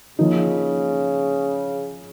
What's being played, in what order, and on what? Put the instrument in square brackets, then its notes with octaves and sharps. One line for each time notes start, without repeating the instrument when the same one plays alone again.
[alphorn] C#3 [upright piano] F3 A#3 D#4